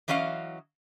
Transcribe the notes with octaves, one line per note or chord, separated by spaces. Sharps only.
E3 F#3 C#4 D#5 F5